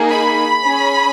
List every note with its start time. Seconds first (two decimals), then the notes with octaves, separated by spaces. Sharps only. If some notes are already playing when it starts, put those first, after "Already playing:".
Already playing: A#3 D#4 G#4
0.10 B5
0.64 C#4 G#4